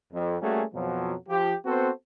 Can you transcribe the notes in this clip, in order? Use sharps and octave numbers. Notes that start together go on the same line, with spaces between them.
F2
G3 A3 A#3 C#4 F#4 G#4
F2 B2 F3 F#3
F3 G4
B3 C4 F#4 A4 B4 C5